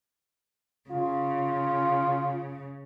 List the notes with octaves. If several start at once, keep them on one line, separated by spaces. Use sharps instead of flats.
C#3 F4